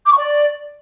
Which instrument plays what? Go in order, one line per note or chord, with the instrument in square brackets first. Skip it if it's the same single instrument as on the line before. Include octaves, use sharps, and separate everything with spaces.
[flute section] D6
C#6
D5